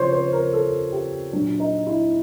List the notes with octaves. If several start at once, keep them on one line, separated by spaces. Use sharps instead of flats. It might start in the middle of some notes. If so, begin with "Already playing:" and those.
Already playing: C#3 F3 C5 C#5
C5
A#4
A4
G4
A#2 F#3 D4
D#4
E4